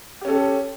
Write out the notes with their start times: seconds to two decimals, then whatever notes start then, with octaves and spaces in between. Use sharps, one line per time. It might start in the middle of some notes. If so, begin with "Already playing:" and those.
0.21 G4
0.25 C#4
0.28 A4